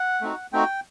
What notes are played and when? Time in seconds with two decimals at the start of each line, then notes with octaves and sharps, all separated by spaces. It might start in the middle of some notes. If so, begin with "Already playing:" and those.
Already playing: F#5
0.21 A3 C4 D#4 F#4
0.53 A3 C4 D#4 F#4 G5